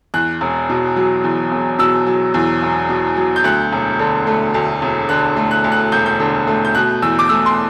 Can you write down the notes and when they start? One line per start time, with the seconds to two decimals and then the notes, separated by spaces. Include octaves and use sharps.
0.14 E2 F#6
0.41 E1
0.69 B2
0.96 F#3
1.24 E2
1.52 E1
1.79 B2 E6
2.07 F#3
2.34 E2
2.62 E1
2.89 B2
3.17 F#3
3.36 G6
3.44 D2 F#6
3.73 E1
3.99 D3
4.27 A3
4.54 D2
4.82 E1
5.09 D3 F#6
5.37 A3
5.51 F#6
5.64 D2
5.72 F#6
5.92 E1 G6
6.06 G6
6.20 D3
6.47 A3
6.65 G6
6.75 B2 F#6
7.02 E2 E6
7.19 D6
7.29 A3 E6
7.46 C6